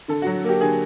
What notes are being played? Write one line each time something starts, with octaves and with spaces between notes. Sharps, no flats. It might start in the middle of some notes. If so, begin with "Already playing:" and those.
D3 A4
F#4
F#3
A#3 G4
D3 G#4